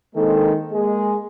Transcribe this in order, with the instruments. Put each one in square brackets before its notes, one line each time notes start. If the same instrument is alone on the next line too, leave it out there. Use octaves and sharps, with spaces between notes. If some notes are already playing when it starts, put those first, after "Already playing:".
[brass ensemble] D#3 G#3 A#3 C4 D4 A4
G#3 A#3 G#4